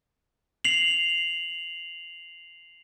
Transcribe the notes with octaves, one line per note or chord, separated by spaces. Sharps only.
C7 F7 F#7